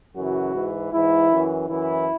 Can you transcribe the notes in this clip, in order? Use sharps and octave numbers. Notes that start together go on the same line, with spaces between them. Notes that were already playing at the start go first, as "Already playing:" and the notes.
F#2 C#3 E3 F#4
G#2 E3
G#2 E3 E4
F#2 E3
F#2 E3 E4